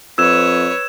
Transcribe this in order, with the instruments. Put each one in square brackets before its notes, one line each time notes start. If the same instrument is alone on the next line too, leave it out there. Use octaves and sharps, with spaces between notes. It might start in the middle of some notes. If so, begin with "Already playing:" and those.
[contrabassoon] F2 [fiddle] B4 C#5 [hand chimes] E6 [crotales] F#6 G#6 E7